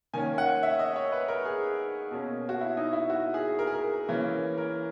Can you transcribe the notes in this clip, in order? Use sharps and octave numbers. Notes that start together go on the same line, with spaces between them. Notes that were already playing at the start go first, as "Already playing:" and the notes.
D#3 A#3 C#4 G#5
F#5
E5
D#5
C#5
B4
A#4
G#4
B2 A#3 C#4
F#4
E4
D#4
E4
F#4
G#4
A#4
G#4
A#4
E3 A#3 C#4
A#4